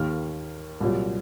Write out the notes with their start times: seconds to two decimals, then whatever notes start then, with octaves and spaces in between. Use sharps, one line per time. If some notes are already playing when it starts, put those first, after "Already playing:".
Already playing: D#2 D#3 A#3 F6
0.80 C2 A#2 F#3